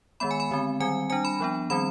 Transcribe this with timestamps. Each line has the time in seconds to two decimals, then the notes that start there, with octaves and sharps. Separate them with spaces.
0.20 D#3 G#3 B3 B5
0.31 G#5
0.40 B5
0.51 D3 G#3 C4
0.80 D#3 G3 C4 G#5
1.10 G3 D4 G#5
1.25 B5
1.40 F3 B3 D4
1.70 D#3 G3 C4 B5